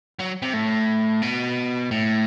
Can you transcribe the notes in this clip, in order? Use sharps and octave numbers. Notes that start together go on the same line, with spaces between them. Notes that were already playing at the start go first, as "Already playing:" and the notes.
F#3
C3
A2
B2
A2